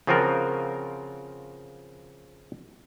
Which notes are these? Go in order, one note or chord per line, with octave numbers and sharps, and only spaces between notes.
C#3 F3 C4 F4 F#4 A#4